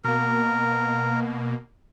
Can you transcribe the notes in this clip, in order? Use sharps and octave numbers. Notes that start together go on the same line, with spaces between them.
B2 A#3 A#4